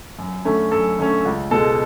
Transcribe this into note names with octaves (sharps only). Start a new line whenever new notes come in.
F#2
D3 A3 C#4
F#2 A4
D3 A3 C#4
C#2
B2 G#3 A4